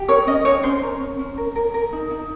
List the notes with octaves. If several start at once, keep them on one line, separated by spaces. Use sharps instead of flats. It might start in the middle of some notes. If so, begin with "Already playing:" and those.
Already playing: G4
A#4 C#5
C#4 D#5
C#4 C#5
C#4 C5
A#4
C#4
C#4
A#4
A#4
A#4
D#4
D#4